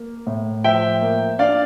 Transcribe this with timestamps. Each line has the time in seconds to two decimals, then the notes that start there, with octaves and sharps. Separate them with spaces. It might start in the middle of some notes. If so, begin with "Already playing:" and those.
Already playing: A#3
0.27 A2
0.64 F3 E5 G5
1.01 A#3
1.39 D4 D5 F5